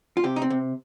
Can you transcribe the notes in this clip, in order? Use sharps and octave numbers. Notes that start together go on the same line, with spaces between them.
F4
C3 G4
D#4
C4
C3